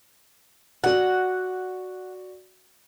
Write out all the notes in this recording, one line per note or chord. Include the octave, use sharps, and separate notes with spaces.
F#4 D5 F#5